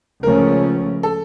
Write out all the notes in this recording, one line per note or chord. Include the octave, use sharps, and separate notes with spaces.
C#2 C#3 F3 A3 C#4 A#4
A4